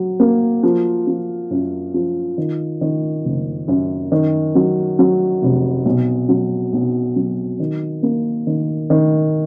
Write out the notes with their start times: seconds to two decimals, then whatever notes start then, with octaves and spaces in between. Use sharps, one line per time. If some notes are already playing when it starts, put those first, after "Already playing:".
Already playing: F#3
0.20 A#3
0.63 F3
1.07 F3
1.51 F#2
1.94 F3
2.38 D#3
2.81 D#3
3.24 F#1
3.68 F#2
4.12 D#3
4.55 F#3
4.99 F#3
5.42 F1
5.85 B1
6.29 F#3
6.73 B1
7.16 F#3
7.60 D#3
8.03 A#3
8.47 D#3
8.90 D#3